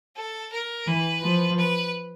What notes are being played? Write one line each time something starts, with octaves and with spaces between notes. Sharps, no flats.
A4
A#4
E3 B4
F3
B4